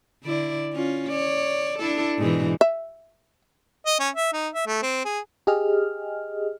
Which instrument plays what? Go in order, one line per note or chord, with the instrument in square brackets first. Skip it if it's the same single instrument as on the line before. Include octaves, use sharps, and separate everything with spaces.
[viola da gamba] D3 E4 D5
C#4 F4
C#5 D5
D4 E4 A4
G#2 B2 E3
[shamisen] E5
[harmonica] D#5
C#4
E5
D#4
E5
A3
C4
G#4
[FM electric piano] G4 G#4 D#5 F6